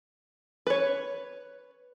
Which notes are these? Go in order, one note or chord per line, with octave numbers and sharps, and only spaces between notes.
B4 C#5